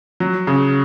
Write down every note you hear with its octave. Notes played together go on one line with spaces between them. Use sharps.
F#3
C#3